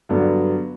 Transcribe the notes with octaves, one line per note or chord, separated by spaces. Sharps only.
G2 D3 F#3 B3